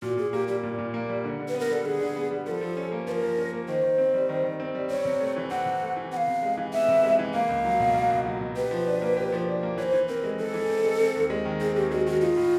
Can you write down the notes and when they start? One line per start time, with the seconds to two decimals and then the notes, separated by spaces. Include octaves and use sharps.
0.02 A#2 F#4
0.17 A#2 G#4
0.33 A#3 G4
0.48 G3 G4
0.63 A#2
0.78 A#2
0.94 A#3
1.09 G3
1.24 D3
1.39 D3
1.48 B4
1.55 B3
1.60 A#4
1.70 G3 A4
1.85 D3 G#4
2.01 D3
2.16 B3
2.30 G3
2.46 F3 A4 A#4
2.61 F3
2.77 C#4
2.92 A#3
3.07 F3 A#4 B4
3.23 F3
3.38 C#4
3.53 A#3
3.68 D#3 C5
3.83 D#3
3.98 C4
4.14 G3
4.29 D#3
4.44 D#3
4.60 C4
4.75 G3
4.90 C4 C#5
5.05 C3
5.20 A3
5.36 E3
5.51 C4 F#5
5.66 C3
5.82 A3
5.97 E3
6.12 B3 F#5
6.17 F5
6.27 C3
6.43 G#3
6.57 E3
6.73 B3 E5
6.88 C3
7.03 G#3
7.19 E3
7.34 A#3 F5
7.49 C#2
7.65 F#3
7.80 B2
7.95 A#3
8.10 C#2
8.25 F#3
8.41 B2
8.56 G4 B4
8.71 F3
8.86 D4
9.02 A#3
9.17 G4
9.32 F3
9.48 D4
9.63 A#3
9.77 E3 C#5
9.83 C5
9.93 E3
10.08 C4 A#4
10.24 G#3
10.39 E3 A4
10.54 E3
10.69 C4
10.85 G#3
11.00 C4
11.15 D#2
11.30 G#3
11.45 D#3
11.61 C4 G#4
11.76 D#2 G4
11.91 G#3 F#4
12.07 D#3 F#4
12.21 D#4 F4
12.36 A2